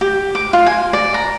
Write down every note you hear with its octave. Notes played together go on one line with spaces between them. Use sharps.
G4
D6
F4
G#5
D5
A#5